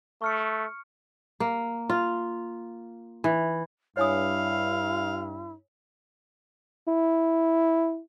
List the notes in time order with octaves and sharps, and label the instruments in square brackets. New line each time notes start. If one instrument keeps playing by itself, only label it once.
[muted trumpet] A3 [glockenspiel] C#6 F6 C#7
[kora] A#3
F4
E3
[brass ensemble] G2 [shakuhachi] E4 [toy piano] C#5 G#5 D#6 [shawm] F5
[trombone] E4